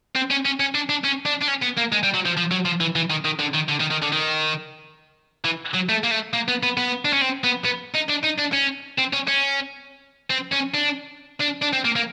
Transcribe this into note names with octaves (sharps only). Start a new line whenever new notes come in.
C4
C#4
C#4
C#4
D4
D4
C#4
D4
D4
C#4
B3
A#3
G#3
G3
F#3
F3
F3
F#3
F3
E3
E3
D#3
D#3
D3
D#3
D3
D#3
D#3
D3
D#3
E3
F#3
A3
A#3
A3
A#3
B3
B3
B3
D4
C#4
C4
B3
B3
D#4
D4
D#4
D4
C#4
C4
C#4
C#4
C4
C#4
D4
D4
D4
C4
A#3
A#3